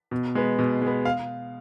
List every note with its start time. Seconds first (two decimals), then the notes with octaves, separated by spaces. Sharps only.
0.11 B2
0.35 G#3 B3
0.59 B2
0.82 G#3 B3
1.05 F5